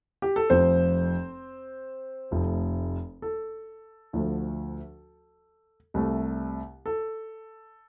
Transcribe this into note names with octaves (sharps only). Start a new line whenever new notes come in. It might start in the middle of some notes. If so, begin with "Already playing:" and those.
G4
A4
F1 F2 F3 C4 C5
F1 F2 F3 A3
A4
D2 D3 F3 A3
C2 C3 A3
A4